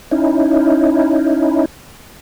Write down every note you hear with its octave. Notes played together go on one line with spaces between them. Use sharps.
C#4 D#4 E4